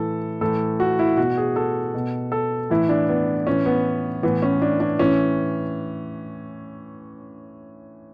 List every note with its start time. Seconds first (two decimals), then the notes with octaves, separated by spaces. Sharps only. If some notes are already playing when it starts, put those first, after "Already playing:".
Already playing: A2 E3 A4
0.41 A2 E3 A4
0.80 F#4
0.99 E4
1.17 B2 F#4
1.37 G#4
1.56 A4
1.94 B2
2.32 A4
2.70 A2 E3 E4
2.89 D4
3.08 B3
3.47 A2 E3 C#4
3.66 B3
4.23 A2 E3 B3
4.42 C#4
4.62 D4
4.80 D4
4.99 A2 E3 C#4